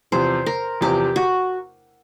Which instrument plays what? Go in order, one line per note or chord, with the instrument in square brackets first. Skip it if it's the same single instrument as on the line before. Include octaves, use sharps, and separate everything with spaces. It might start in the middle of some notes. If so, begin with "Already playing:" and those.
[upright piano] E2 C3 F3 [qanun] C5
[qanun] A#4
[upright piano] E2 C3 F3 [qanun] G4
[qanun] F#4